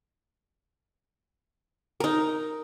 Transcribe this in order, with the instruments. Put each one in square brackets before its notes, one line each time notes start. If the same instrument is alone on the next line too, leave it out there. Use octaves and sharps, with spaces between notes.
[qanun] D#4 A#4